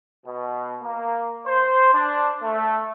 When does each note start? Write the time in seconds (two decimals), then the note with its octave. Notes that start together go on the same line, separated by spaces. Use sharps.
0.25 B2
0.82 A#3
1.47 C5
1.94 D4
2.43 A3